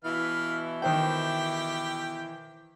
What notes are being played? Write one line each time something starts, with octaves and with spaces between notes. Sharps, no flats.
B2 E3 E4 B4 F5
D#3 G4 C5 G5